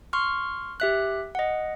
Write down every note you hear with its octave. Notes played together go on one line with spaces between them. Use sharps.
C6 C#6 F6
G4 E5 F#6
D#5 F#5